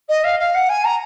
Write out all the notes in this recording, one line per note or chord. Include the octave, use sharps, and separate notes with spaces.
D#5
F5
F5
F#5
G#5
A#5